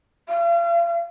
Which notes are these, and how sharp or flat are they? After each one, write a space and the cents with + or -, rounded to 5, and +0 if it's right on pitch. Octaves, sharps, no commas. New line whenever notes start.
F5 -40